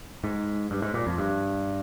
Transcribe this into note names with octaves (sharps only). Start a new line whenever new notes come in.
G#2
G2
G#2
A#2
F2
G2